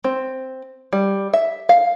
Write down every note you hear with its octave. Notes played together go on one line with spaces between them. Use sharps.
C4
G3
E5
F5